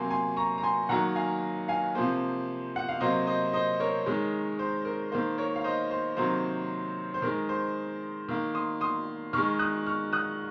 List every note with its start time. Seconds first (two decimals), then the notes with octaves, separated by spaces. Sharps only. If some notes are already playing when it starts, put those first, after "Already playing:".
Already playing: C3 F#3 A#3 G#5 C6
0.10 G#5 C6
0.37 A#5 C#6
0.58 A#5
0.63 G#5 C6
0.89 D#3 F#3 A#3 F#5 A#5
1.16 F5 G#5
1.68 F5 G#5
1.95 C3 F3 A#3 C5
2.76 F#5
2.89 F5
3.00 C3 F#3 A#3 C5 D#5
3.27 C5 D#5
3.53 C5 D#5
3.80 A#4 C#5
4.06 D#3 G#3
4.59 C5
4.85 A#4
5.12 D#3 A#3 C5
5.38 A#4 C#5
5.56 F5
5.64 C5 D#5
5.91 C5
6.17 C3 D#3 F#3 A#3 C5
7.14 C5
7.22 D#3 G#3 A#4
7.49 C5
8.28 D#3 A#3
8.54 C6 D#6
8.81 C6 D#6
9.33 D#3 G#3 C#6 F6
9.59 D#6 F#6
9.86 C#6 F6
10.13 D#6 F#6